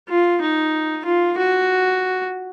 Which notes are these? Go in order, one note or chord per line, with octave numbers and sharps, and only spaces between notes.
F4
D#4
F4
F#4